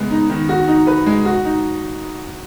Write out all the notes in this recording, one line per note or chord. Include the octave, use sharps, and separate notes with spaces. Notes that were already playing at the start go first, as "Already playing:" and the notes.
Already playing: C#3 G#3 B3
D#4
D#3
F#4
D#4
B4
G#3
F#4
D#4